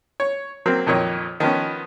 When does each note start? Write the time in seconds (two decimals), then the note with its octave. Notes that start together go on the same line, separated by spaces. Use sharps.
0.20 C#5
0.66 F#3 A#3 C4
0.87 F2 A#2 D#3 C#5
1.40 D#3 F3 B3 C#4